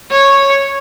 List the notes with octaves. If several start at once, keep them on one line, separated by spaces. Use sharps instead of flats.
C#5